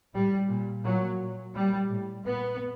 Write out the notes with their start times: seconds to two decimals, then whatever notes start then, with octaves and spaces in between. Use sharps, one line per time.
0.14 A2 G3
0.49 A#2
0.84 A#2 F#3
1.20 A#2
1.54 A#2 G3
1.89 A2
2.24 A#2 B3